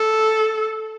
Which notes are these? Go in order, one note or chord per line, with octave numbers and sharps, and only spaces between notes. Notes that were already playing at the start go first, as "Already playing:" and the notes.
Already playing: A4